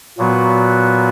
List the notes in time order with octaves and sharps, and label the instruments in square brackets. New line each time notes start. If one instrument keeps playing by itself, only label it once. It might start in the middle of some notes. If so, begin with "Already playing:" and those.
[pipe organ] A#2 F#3 B3 F#4